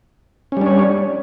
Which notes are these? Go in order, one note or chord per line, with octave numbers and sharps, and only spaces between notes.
G3 C#4 D4 C#5